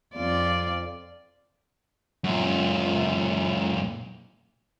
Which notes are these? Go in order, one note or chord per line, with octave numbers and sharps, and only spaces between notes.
F2 F4 D5
F#2 A#2